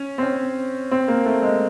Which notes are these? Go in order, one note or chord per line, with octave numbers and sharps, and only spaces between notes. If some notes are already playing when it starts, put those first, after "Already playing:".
Already playing: C#4
C4
C#4
C4
A#3
A3
G#3